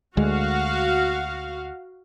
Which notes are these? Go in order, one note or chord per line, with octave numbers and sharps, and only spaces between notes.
D2 G#3 F#4 F5